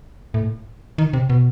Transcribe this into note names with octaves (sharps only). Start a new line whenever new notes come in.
A2
D#3
C3
B2